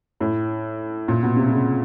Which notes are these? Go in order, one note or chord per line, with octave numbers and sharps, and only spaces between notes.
A2
A#2
B2
C3
C3
C#3